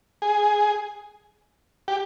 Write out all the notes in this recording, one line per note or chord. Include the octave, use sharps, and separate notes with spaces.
G#4
G4